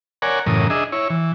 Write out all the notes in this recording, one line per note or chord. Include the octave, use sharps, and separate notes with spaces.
A#4 C#5 D5 F#5 G#5
F#2 A2 C#3 E3 A#4 D#6
D4 G#4 D#5 E5
E4 C#5
E3